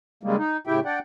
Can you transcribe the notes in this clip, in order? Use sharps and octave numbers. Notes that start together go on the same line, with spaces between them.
C#3 G3 G#3 A#3
D#4
A2 C#3 E4 G4 E5 G5
D4 D5 F#5 G5